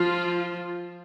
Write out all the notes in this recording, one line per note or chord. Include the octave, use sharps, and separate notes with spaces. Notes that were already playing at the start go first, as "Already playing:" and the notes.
Already playing: F3 F4